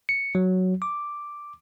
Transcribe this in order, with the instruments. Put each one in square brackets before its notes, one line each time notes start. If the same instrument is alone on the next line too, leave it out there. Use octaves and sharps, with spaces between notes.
[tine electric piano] C#7
F#3
D6